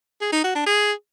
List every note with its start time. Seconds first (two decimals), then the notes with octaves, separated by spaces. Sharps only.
0.21 G#4
0.32 D#4
0.44 F#4
0.55 D4
0.67 G#4